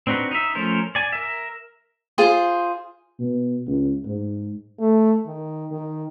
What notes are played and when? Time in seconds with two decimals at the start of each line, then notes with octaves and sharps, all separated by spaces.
0.07 C4 D4 D#4 F#4 B4
0.31 D#4 E5
0.55 F3 A3 C#4 A#4 C5
0.95 D5 G#5
1.12 A#4 E5
2.18 F4 G#4 C5
3.19 B2
3.67 C#2
4.06 G#2
4.80 A3
5.27 D#3
5.71 D#3